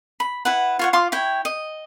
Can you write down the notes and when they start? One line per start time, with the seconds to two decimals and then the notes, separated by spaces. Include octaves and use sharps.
0.20 B5
0.45 E4 B4 F#5
0.79 F4 C#5 F#5
0.93 F4 F5 C6 D6
1.12 E4 C#5 G5
1.45 D#5